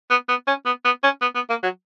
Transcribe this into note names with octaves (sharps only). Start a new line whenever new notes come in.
B3
B3
C#4
B3
B3
C#4
B3
B3
A#3
F#3